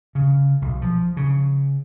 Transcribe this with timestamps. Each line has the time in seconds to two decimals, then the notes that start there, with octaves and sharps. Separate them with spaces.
0.15 C#3
0.62 B1
0.82 F3
1.17 C#3